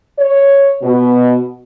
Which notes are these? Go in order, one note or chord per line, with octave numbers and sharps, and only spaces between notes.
C#5
B2